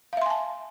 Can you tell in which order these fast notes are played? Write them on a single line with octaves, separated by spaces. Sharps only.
F5 E5 C6 G#5 A5